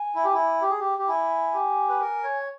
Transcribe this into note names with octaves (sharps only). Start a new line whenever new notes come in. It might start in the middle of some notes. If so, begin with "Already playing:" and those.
Already playing: G#5
E4
G4
E4
G4
G#4
G4
G4
E4 G#5
G4
B4
A#4
C#5